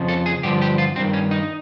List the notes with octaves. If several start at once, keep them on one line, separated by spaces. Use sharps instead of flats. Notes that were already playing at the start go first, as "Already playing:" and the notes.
Already playing: F2 C#3 F3
A4
G#4
G2 D3 F3 G4
G4
F4
G2 D#3 C4
C#4
D#4